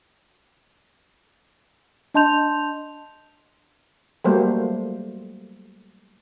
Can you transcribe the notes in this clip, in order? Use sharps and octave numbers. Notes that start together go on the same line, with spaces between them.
D4 D#5 A5 C6 G6 F7
F#3 G3 A3 A#3 C5